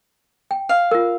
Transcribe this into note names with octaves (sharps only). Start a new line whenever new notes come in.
G5
F5
F4 A#4